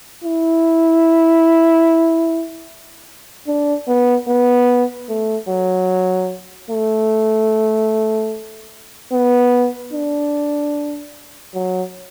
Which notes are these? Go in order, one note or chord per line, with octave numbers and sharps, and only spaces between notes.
E4
D4
B3
B3
A3
F#3
A3
B3
D4
F#3